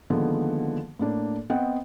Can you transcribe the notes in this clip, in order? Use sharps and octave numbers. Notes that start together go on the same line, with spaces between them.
D3 D#3 F3 G#3 A#3 B3
A2 A#3 D4
B3 C4 D#5 F#5 G5